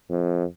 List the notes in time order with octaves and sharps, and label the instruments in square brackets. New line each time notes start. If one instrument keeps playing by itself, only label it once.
[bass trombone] F2